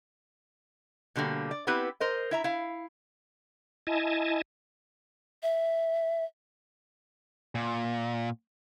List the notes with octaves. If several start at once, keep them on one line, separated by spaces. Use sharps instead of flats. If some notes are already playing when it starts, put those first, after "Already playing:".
B2 D3 G3 A#3
D5
B3 C4 E4 G4 B4
A#4 C5 D#5
E4 E5 A#5
E4 F5
E4 D#5 G#5 A5
E5
A#2